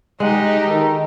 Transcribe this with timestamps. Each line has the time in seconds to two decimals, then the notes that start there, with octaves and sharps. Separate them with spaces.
0.20 G#3 D#4 G4 F#5
0.68 D#3 A4 A#5